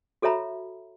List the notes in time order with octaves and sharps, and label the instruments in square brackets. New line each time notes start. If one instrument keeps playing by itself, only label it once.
[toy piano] F#4 A4 C#5 E5 A#5 B5